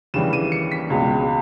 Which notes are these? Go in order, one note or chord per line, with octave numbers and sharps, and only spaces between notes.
D#2 C#3 E3 G3 E7
D#7
C#7
B6
C#2 B2 G#3